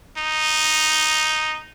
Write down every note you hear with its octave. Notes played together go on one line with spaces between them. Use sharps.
D#4